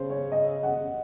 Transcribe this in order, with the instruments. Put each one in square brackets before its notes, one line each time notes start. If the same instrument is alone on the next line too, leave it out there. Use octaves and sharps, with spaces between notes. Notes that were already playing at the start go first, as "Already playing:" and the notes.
Already playing: [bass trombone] C#3 [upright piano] C5
[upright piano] C#5
D#5
F#5